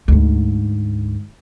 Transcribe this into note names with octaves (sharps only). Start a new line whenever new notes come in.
D2 G#2